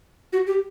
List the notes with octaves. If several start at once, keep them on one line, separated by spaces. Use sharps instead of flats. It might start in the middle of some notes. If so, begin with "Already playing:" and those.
F#4
G4